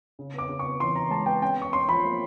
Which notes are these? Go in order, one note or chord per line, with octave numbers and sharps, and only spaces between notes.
C#3
B3 D6
C#3
C#6
B3
E3 C6
E3 A#5
G#3 A5
B3 G5
C#4 G5
C#4 C#6
C#4 C6
F3 B5
A#3